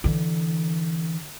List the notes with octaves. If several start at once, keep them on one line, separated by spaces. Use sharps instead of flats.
D3 E3